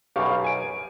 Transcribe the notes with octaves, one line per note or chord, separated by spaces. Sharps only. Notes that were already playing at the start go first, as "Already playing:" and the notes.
B1 F#2 B2 G4 F5 C#6
G#5 D7